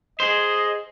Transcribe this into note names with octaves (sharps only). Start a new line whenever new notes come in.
G#4 C5 D#5